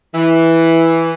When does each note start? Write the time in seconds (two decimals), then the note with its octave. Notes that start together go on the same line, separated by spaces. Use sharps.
0.15 E3